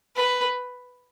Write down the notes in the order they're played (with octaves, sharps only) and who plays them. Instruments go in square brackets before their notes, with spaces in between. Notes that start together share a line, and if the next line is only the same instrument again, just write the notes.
[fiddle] B4